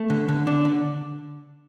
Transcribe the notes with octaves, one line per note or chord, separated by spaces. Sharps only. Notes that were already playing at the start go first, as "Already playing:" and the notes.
Already playing: A3
D3
D3
D4
D3